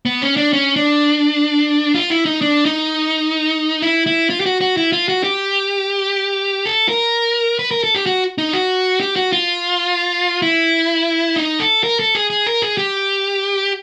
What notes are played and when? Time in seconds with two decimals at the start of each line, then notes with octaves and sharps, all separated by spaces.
0.05 B3
0.22 C#4
0.37 D4
0.53 C#4
0.76 D4
1.94 F4
2.10 E4
2.25 D#4
2.41 D4
2.65 D#4
3.82 E4
4.06 E4
4.30 F4
4.40 G4
4.46 F#4
4.61 F#4
4.77 E4
4.92 F4
5.09 F#4
5.24 G4
6.66 A4
6.89 A#4
7.59 B4
7.71 A#4
7.84 A4
7.95 G4
8.06 F#4
8.38 D#4
8.53 F#4
9.01 G4
9.16 F#4
9.33 F4
10.42 E4
11.36 D#4
11.60 A4
11.84 A#4
12.00 A4
12.15 G#4
12.30 G#4
12.47 A#4
12.62 G#4
12.78 G4